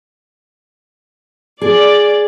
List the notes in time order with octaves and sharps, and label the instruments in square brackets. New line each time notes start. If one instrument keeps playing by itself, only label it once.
[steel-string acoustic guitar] G#4 [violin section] D5